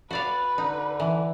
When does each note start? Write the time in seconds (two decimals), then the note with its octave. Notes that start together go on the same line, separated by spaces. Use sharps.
0.11 F#4 B4 D5 F5
0.58 D3 D#4
1.00 E3